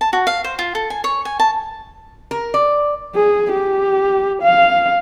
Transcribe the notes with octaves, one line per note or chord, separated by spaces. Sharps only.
A5
F#4
F5
C5
F4
A4
G#5
C#5
G#5
A5
A#4
D5
G#4
G4
F5